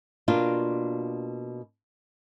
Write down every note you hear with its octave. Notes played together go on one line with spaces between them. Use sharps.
B2 A#3 D4 F4